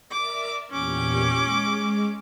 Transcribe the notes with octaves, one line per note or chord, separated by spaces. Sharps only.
A#4 D5 E5 D6
E2 A#2 C#4 G4 D6
G#3